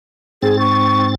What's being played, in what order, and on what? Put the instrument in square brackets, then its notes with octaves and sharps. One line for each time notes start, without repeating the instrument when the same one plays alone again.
[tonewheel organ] G#2 C4 A6 [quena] G#4
[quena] C#6